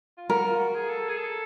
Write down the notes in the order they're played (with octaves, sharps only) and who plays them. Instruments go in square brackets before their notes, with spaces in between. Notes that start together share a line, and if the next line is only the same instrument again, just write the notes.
[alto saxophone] F4
[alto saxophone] F#4 [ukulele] A#4
[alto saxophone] F4
F#4
G#4
A4
G#4
A4